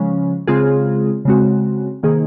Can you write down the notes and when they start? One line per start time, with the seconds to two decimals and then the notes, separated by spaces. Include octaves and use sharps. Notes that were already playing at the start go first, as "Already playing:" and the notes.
Already playing: C#3 F3 G#3 C#4
0.47 C#3 G#3 C4 F4 G#4
1.25 C#3 G#3 C4 F#4
2.03 C3 D#3 A#3 D#4 G#4